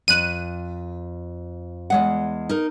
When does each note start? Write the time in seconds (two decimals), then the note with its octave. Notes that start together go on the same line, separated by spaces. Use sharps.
0.08 F2 F#6 D#7
1.90 E2 G#3 F#5
2.49 D#4 A#4